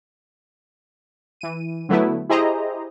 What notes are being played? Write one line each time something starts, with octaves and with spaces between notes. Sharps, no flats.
E3 D#7
D3 F#3 A3 B3 E4
E4 G4 G#4 C5 D#5 A#5